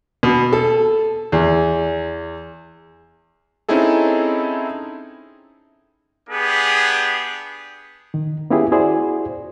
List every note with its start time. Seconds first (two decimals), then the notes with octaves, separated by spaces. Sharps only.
0.23 B2
0.53 A4
1.32 E2
3.69 C4 C#4 D#4 E4 G#4 A4
6.29 B3 D4 G4 G#4
8.14 D#3
8.50 B3 C#4 E4 F4 G4 G#4
8.72 E4 F#4 G#4 C5 D5